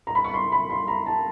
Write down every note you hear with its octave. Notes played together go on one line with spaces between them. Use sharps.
A#5
B5
C#6
C6
B5
C6
A#5
A5